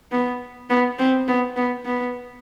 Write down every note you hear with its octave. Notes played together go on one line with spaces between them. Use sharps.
B3
B3
C4
B3
B3
B3